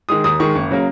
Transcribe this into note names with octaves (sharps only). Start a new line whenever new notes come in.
D#3 G#3 D#6
D#2 D#6
D#3 G#3 C#6
F#1
C#3 F#3 A#3